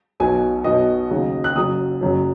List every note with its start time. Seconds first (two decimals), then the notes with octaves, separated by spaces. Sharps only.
0.20 B1 B2 F#3 G#5
0.64 B1 B2 F#3 D#5
1.10 D#2 C#3 F#3
1.44 F#6
1.56 F#1 F#2 F#3 D#6
2.01 F#1 F#2 F#3